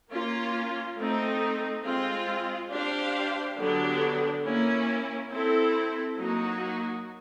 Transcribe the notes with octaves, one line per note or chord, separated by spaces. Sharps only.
A#3 C#4 F4
A3 C4 D#4
G#3 C4 F4
D4 G4 C5 F5
D3 F#3 B3 D4 G4
A#3 C#4 E4
C4 E4 A4
F#3 A#3 D#4 F#4